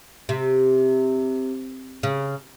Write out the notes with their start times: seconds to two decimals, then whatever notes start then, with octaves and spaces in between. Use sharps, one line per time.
0.29 C3
2.03 C#3